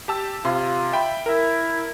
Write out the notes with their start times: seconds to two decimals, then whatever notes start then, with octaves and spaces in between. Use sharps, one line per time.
0.08 G4 A5 E6
0.45 C3 F4 C6
0.93 E5 G5 B5
1.26 E4 A#4 E5